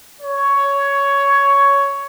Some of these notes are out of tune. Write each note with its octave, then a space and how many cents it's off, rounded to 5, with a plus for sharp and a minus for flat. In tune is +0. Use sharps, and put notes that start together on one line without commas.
C#5 +10